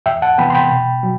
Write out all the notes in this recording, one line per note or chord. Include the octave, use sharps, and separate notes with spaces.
E2 E5 G5
F#5 A5
C3 E3 B3 G5 B5
C6
G5 B5
B2
F#3